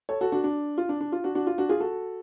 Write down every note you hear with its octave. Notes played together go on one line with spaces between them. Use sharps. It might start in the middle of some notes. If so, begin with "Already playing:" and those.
A4 C#5
F#4 A4
D4 F#4
D4
F4
D4
D4
F4
D4 F#4
D4 F#4
F4
D4 F#4
F4 G#4
F#4 A4